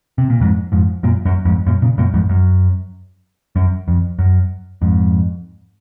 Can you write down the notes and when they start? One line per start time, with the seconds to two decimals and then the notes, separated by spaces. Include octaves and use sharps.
0.18 C3
0.30 A#2
0.40 F2 G#2
0.72 F2 G#2
1.03 F#2 A#2
1.25 F#2
1.45 F2 G#2
1.67 F#2 A#2
1.82 A#2 C#3
1.98 F#2 A#2
2.14 F2 G#2
2.29 F#2
3.56 F#2
3.88 F2
4.19 F#2
4.82 F2 G#2